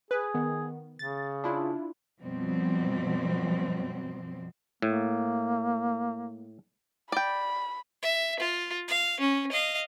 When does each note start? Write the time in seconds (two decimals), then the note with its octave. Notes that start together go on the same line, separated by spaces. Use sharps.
0.11 G#4 B4
0.34 D#3 B3
0.99 C#3 A6
1.44 D4 E4 F4
2.21 F#2 B2 F3 G3 C4
4.82 A2 A#3
7.12 D5 G5 B5
8.03 E5
8.40 F4
8.88 F5
9.20 C#4
9.52 D#5 F5